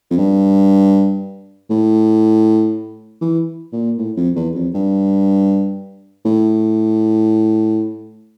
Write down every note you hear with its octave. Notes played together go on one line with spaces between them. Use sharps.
F2
G2
A2
E3
A#2
A2
F2
E2
F2
G2
A2